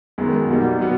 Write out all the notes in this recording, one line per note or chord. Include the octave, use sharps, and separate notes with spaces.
F#2 D#3 G#3 B3
B2 G3 A#3 D#4
B2 F#3 B3